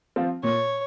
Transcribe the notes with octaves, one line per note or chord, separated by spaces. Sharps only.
F3 C4 F4
A#2 C#5